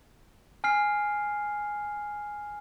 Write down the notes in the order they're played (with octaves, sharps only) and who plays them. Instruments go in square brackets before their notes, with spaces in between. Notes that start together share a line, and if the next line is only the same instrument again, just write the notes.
[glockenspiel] G#5 F6 C7